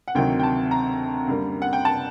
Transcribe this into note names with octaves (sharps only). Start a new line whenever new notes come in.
F#5
D2 C3 D#3 F#3 G5
G5
A5
A#5
F#2 D3 G3 A#3
F#5
G5
A5